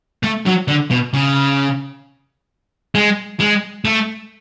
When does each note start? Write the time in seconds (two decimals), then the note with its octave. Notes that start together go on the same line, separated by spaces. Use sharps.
0.23 A3
0.46 F#3
0.68 D3
0.91 B2
1.14 C#3
2.95 G#3
3.40 G#3
3.85 A3